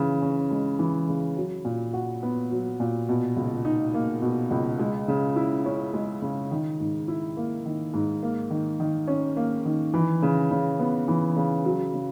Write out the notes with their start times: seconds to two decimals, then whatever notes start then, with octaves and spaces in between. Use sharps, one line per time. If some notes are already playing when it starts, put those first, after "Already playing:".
Already playing: C#3 E3
0.22 C#4
0.51 G#3
0.79 E3
1.09 C#3
1.37 F#3
1.65 A#2
1.93 F#4
2.23 B3
2.51 F#3
2.80 A#2
3.09 B2
3.36 C#2
3.65 D#4
3.94 A#3
4.22 B2
4.51 C#2
4.79 G#3
5.08 C#3
5.36 E4
5.66 C#4
5.94 G#3
6.22 C#3
6.51 D#3
6.80 G#2
7.08 E4
7.37 A#3
7.65 D#3
7.94 G#2
8.23 A#3
8.50 D#3
8.80 D#3
9.08 C#4
9.36 A#3
9.65 D#3
9.94 E3
10.22 C#3
10.51 C#3
10.79 B3
11.08 E3
11.37 C#3
11.65 F#3
11.94 C#3